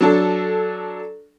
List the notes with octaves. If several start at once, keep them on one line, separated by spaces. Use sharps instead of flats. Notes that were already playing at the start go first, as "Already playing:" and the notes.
F#3 D4 A4